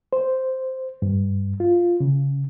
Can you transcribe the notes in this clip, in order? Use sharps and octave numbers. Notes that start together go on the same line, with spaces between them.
C5
G2
F4
C#3